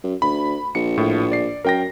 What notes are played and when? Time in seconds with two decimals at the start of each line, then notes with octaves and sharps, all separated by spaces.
0.04 F#2
0.22 D2 B5
0.75 A#1 C#7
0.98 A2
1.31 D5 C7
1.65 F#2 A#4 G5 A#6